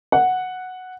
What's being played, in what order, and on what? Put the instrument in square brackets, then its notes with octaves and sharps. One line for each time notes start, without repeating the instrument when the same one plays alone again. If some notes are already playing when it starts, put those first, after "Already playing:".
[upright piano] F#5